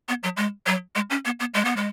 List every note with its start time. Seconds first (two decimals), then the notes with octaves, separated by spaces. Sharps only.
0.09 B3
0.23 F#3
0.37 G#3
0.66 F#3
0.95 G#3
1.10 C#4
1.25 B3
1.40 B3
1.54 G#3
1.65 B3
1.76 G#3